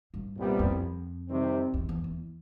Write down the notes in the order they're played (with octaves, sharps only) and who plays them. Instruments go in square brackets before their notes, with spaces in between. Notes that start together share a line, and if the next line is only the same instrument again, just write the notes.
[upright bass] G2
[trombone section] C2 A#2 G3 B3
[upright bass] F2
[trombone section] C3 D#3 G3 C4
[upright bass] E2
E2
E2